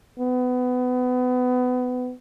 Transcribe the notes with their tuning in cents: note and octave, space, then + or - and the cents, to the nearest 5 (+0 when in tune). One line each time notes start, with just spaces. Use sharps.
B3 +25